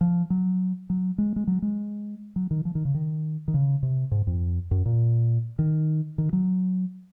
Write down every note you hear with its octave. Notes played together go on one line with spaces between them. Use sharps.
F3
F#3
F#3
G#3
G#3
F#3
G#3
F#3
D#3
F3
D#3
C#3
D#3
D#3
C#3
C3
G#2
F2
F#2
A#2
D#3
D#3
F#3